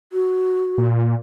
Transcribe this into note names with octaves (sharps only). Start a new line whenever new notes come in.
F#4
A#2